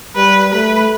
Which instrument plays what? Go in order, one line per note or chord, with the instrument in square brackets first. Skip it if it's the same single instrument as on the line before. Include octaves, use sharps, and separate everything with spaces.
[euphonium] G3 [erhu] B4
[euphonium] A3 [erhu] B4